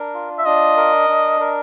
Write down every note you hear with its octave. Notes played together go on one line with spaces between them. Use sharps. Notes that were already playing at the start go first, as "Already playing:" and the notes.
Already playing: D4 A#4
F4
E5
D4 D#5
A#4
D4
A#4